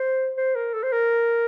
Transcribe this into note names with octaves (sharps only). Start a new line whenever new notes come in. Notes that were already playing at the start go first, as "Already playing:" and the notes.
Already playing: C5
C5
A#4
A4
C5
A#4